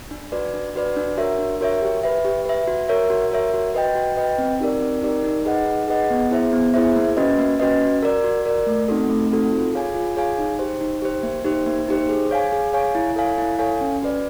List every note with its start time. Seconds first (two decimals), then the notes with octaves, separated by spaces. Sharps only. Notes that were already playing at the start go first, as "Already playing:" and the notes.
0.11 D4
0.32 F#4 B4 D5
0.54 D4
0.75 F#4 B4 D5
0.96 D4
1.17 F#4 A#4 C#5 E5
1.39 D4
1.61 F#4 A#4 C#5 E5
1.82 G4
2.03 B4 E5
2.25 G4
2.46 B4 E5
2.68 F#4
2.88 A#4 C#5 E5
3.10 F#4
3.31 A#4 C#5 E5
3.54 F#4
3.75 B4 D#5 G5
3.95 F#4
4.17 B4 D#5 G5
4.38 C4
4.60 D#4 G4 A#4 D5
4.81 C4
5.02 D#4 G4 A#4 D5
5.24 D#4
5.45 G#4 B4 D#5 F#5
5.67 D#4
5.88 G#4 B4 D#5 F#5
6.10 B3
6.31 E4 G#4 C5 E5
6.53 B3
6.74 E4 G#4 C5 E5
6.96 A#3
7.17 C#4 F#4 B4 D#5
7.39 A#3
7.60 C#4 F#4 B4 D#5
7.81 F#4
8.03 A#4 D5
8.24 F#4
8.46 A#4 D5
8.67 A3
8.88 C4 D#4 F#4 A4
9.10 A3
9.31 C4 D#4 F#4 A4
9.52 F4
9.73 G#4 C#5 F5 G#5
9.95 F4
10.17 G#4 C#5 F5 G#5
10.39 D#4
10.59 G4 C5
10.81 D#4
11.02 G4 C5
11.23 A#3
11.44 D#4 G4 C5
11.66 A#3
11.88 D#4 G4 C5
12.09 G#4
12.31 C#5 F5 G#5
12.52 G#4
12.73 C#5 F5 G#5
12.95 E4
13.16 A4 C#5 F5 G#5
13.38 E4
13.59 A4 C#5 F5 G#5
13.81 C#4
14.02 F#4 B4 D5